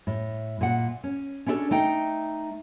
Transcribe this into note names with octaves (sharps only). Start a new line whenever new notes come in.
A2
A#2 F#5
C#4
C#4 D4 E4 F#4 A4 C#5
A3 D#4 G5